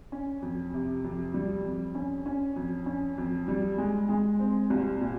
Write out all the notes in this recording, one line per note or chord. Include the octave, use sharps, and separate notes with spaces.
C#4
F2
C3
F2
G3
F2
C#4
C#4
F2
C#4
F2
G3
G#3
G#3
C4
C2
A#2